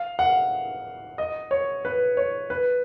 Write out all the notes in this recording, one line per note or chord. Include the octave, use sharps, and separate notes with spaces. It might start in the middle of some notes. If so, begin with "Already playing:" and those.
Already playing: F5
F#5
D#5
C#5
B4
C#5
B4